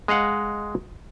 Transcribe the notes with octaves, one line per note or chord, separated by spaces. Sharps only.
G#3 D#5 F5 F#5